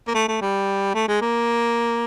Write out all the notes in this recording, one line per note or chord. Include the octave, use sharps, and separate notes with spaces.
A#3
A3
A3
G3
A3
G#3
A#3